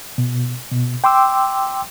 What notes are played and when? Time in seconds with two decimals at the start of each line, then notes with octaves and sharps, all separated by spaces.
0.18 B2
0.72 B2
1.04 G5 C6 D6 E6